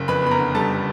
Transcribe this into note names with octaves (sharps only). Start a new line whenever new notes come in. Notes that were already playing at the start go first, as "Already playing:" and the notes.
Already playing: F#1
F2 B4 B5
B3 B5
A#4 A#5
D3
G3 A4 A5